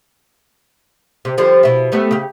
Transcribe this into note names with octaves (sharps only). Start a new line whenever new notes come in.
C3
D3 F3 G3
B2 E4
G3 A3 B3
C#3 G4